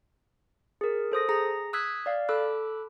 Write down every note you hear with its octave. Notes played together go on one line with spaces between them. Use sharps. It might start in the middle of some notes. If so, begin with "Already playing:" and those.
G#4 A#4
A4 C5 D#6 A#6
G#4 A#5 A#6
D#6 E6 F#6 G#6 B6
D5 F5
A4 B5 D6 E6 F#6